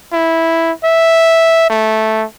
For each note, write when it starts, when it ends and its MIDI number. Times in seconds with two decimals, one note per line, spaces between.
0.13 0.72 64
0.84 1.69 76
1.70 2.24 57